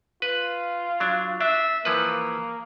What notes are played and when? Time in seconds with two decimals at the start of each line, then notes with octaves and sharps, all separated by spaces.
0.22 F4 B4
1.00 F#3 D4
1.41 D4 E5
1.85 E3 F3 A#3 B4